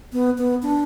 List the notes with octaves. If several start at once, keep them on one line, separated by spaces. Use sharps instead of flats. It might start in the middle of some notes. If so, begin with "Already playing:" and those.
B3
B3
D4